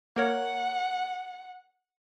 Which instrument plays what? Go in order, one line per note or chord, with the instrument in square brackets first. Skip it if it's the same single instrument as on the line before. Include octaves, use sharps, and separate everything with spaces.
[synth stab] A#3 A#4 C#5 [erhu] F#5